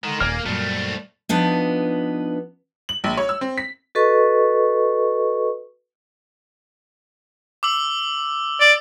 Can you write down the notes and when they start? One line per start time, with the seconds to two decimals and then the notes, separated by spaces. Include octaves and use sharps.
0.04 D3 D#3 G#3
0.21 D#1 A#3 D5 G#5 F6
0.46 F#2 A#2 G3 A3 C4
1.29 F3 B3 D4 D#4
2.89 F#7
3.04 A#1
3.17 C#5
3.29 E6
3.41 C4
3.58 B6
3.95 F#4 A4 B4 D#5 C#6
7.63 D6 E6 F#7
8.60 D5